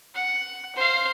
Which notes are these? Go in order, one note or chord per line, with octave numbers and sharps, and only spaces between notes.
F#5
C5 F5